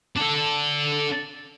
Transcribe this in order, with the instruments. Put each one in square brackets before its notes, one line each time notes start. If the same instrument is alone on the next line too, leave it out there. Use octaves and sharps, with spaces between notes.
[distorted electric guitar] D4 A4